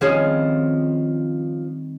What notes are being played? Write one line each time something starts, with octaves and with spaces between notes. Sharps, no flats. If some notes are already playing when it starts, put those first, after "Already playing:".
D#3 F3 G3 C4 C#4 G#4